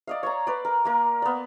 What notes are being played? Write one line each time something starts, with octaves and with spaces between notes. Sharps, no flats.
D5 D#5 F5
C#5 D5 A#5
B4 D5
A#4
A#3 A#4
B3 D5